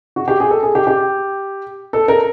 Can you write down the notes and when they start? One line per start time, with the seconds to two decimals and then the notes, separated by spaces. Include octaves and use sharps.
0.16 F#4
0.28 G4
0.40 G#4
0.51 A4
0.63 G#4
0.75 G4
0.87 G4
1.93 A4
2.08 A#4